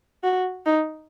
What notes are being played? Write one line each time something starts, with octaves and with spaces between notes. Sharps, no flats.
F#4
D#4